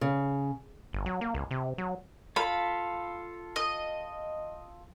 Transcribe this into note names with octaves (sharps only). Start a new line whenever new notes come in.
C#3
G1
F#3
A#3
C#2
C3
F#3
F4 A4 F5 B5
D#5